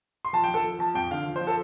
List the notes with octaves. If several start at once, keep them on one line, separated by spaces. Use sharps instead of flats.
C6
F3 A5
G5
F3
A4
F3
F3 A5
F2 G5
D3 F5
F3
C5
F3
A4